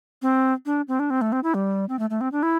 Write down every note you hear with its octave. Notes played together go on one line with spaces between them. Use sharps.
C4
D4
C4
D4
C4
A3
C4
E4
G3
C4
A3
A3
C4
D4
E4